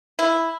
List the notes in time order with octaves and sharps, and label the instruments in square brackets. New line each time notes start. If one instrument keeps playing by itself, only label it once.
[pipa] E4